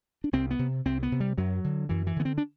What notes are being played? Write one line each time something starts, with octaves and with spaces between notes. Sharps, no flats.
D4
C2 C4
B3
C3
C2 C4
B3
C3
G3
F#2 F#3
D3
F#2 E3
E3
D3 B3
C4
D4